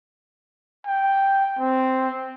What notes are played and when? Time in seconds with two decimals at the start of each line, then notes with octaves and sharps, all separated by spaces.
0.87 G5
1.59 C4